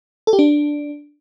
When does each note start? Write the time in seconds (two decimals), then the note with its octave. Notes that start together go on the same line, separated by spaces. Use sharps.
0.27 A4
0.33 G4
0.39 D4